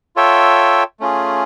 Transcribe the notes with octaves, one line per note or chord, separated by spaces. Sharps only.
F4 A4 C#5 E5 G5
A3 C#4 F4 G#4